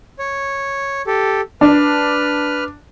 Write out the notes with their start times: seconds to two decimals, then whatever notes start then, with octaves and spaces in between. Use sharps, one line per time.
0.19 C#5
1.07 G4 A4
1.61 D4 B4 F6